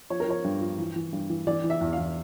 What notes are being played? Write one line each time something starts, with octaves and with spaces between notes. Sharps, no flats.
F3 C#5
A#4
F3 C#5
G2
F3
E3
E3
G2
E3
E3 D5
E3
E5
E2
F5
E2